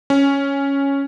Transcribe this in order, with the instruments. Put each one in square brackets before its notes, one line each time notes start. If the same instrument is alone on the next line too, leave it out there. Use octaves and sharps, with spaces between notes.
[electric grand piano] C#4